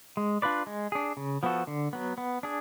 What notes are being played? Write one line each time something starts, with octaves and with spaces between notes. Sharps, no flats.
G#3
D4 F4 B4 D5
G#3
D4 G#4
C#3
F3 B3 F#4 A4
D3
F#3 B3
B3
D4 G#4